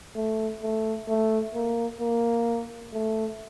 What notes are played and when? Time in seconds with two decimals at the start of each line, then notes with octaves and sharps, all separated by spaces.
0.16 A3
0.62 A3
1.08 A3
1.54 A#3
2.00 A#3
2.93 A3